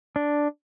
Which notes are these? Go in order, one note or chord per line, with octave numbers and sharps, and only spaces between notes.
D4